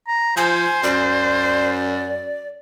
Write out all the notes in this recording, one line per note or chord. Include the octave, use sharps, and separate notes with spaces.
A#5
F3 C5 G#5
F#2 D5